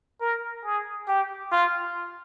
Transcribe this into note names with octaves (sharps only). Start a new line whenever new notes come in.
A#4
G#4
G4
F4